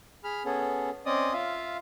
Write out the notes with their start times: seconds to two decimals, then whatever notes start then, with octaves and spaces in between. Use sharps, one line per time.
0.24 G#4 B5 F6
0.45 B3 C#4 G#4 A4
1.06 C4 C#4 D5 D#5 D#6
1.33 F4 E5 F5